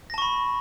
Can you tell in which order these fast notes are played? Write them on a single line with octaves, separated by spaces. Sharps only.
A#6 A5 C#6 B5